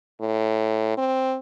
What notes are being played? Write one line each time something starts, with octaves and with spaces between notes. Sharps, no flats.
A2
C4